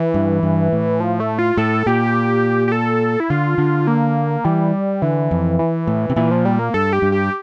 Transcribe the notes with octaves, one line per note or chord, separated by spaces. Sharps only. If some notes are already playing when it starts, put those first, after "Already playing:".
Already playing: E3
G2
G2
A2
F3
A3
F4
A2 A4
A#2 G4
G4
A4
E4
D3 F4
D3
A#3
E3 G3
D3 E3
F2
E3
A2
C3
A#2 E3
F3
G3
A#3
G2 A4
G4
G2
G4